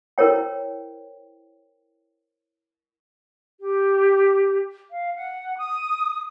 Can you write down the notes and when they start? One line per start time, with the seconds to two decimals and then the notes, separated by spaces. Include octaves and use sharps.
0.18 E4 A#4 C5 C#5 G5
3.59 G4
4.90 F5
5.14 F#5
5.56 D#6